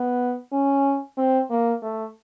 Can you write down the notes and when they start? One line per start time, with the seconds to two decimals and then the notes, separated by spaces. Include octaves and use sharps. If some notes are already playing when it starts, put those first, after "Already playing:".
Already playing: B3
0.52 C#4
1.18 C4
1.50 A#3
1.82 A3